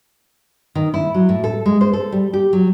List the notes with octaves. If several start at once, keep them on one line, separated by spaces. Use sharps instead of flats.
D#3
E4
F#3
A2
A4
G#3
C5
A4
G3
G4
F#3